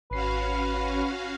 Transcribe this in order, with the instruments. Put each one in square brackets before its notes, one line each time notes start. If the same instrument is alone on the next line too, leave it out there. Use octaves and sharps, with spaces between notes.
[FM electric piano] G#1 C7 [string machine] C#4 F#4 F5 [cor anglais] B4